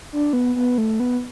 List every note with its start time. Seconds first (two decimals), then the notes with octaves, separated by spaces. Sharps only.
0.13 D4
0.33 B3
0.56 B3
0.78 A3
1.00 B3